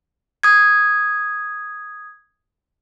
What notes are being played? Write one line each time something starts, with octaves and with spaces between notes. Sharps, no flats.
D#6 G#6